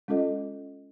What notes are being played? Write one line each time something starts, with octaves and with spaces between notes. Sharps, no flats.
G#3 C#4 F4 A4 D#5